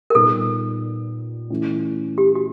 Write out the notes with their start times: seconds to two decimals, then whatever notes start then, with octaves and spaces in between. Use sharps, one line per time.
0.10 A#4
0.15 A#2 G3 B3 D#4 A4
1.50 E3 A3 C#4
2.18 G4
2.35 F#4